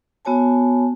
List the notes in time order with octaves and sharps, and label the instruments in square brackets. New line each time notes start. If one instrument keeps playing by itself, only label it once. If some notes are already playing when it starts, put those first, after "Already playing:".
[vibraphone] B3 F#4 C#5 G#5 A5